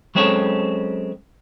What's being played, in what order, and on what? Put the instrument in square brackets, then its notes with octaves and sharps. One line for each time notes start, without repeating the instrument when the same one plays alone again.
[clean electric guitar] F#3 G#3 C4 C#4 A4 C#5